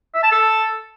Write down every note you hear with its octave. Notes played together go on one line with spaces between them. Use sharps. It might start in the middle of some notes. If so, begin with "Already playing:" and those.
E5
A5
A4